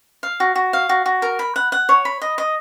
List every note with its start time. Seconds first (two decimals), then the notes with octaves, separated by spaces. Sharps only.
0.23 F5
0.40 F#4
0.55 F#4
0.73 F5
0.89 F#4
1.06 F#4
1.22 A#4
1.39 B5
1.56 F#5
1.72 F#5
1.89 C#5
2.05 B5
2.22 D#5
2.38 D#5